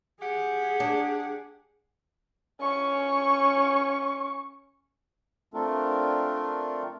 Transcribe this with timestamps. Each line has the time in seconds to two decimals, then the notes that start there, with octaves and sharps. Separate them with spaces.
0.21 G4 G#4 F#5
0.80 D4
2.61 C#4 C#6
5.54 A3 C4 D4 F4 A4 A#4